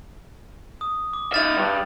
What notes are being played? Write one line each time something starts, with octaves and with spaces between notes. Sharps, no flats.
D#6
D6
D#4 E5 F6 A6 F7
G2